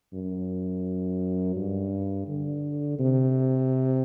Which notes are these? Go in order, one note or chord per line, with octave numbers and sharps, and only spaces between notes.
F#2
G2
D3
C3